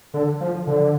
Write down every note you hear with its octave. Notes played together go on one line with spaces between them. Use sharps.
D3
F3
D3